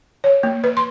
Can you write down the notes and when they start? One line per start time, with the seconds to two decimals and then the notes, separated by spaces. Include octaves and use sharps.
0.24 C#5
0.43 A#3
0.64 B4
0.77 C6